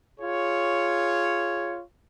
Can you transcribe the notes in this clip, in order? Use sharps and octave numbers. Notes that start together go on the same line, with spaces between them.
F4 G#4 C#5